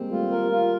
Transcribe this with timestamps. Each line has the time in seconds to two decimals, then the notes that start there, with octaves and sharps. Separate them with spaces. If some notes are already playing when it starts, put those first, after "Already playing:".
Already playing: G3 G#3 A#3 C4
0.11 G3 A3 F4
0.31 A#4
0.52 F4